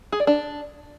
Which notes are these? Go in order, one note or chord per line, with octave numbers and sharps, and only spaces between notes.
G#4
D5
D4